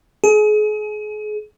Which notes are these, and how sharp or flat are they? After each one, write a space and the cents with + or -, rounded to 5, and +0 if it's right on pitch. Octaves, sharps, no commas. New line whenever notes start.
G#4 +35